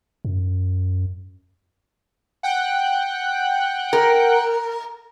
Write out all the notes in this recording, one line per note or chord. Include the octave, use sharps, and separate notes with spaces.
F#2
F#5 G5 F#6
A#4